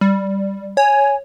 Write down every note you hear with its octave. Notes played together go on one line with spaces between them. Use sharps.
G3
C#5 G#5